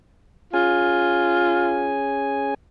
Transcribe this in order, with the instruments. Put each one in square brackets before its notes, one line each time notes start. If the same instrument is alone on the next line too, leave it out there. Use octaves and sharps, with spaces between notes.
[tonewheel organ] C#4 G#4 G#5 [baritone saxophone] F4